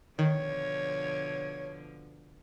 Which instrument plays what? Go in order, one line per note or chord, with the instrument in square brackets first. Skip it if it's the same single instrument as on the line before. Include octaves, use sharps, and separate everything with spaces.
[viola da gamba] B2 D3 F3 [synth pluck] D#3 [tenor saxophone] C#5